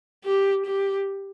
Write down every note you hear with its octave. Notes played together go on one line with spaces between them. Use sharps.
G4
G4